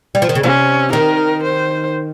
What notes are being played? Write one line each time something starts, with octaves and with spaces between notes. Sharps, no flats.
G3
F3
D#3
C#3
C3 C#4
D#3 A#4
C5